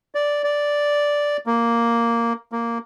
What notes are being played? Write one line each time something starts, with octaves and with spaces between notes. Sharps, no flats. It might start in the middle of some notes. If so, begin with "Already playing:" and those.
D5
D5
A#3
A#3